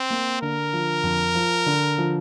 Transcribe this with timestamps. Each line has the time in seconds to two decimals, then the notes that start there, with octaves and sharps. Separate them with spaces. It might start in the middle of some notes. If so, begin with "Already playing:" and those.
Already playing: C4
0.10 A#3
0.42 D3 A#4
0.73 F3
1.03 F2
1.35 F3
1.66 D3
1.98 F3